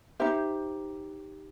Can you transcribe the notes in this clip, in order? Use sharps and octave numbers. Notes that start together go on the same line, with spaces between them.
D#4 G4 C5 E5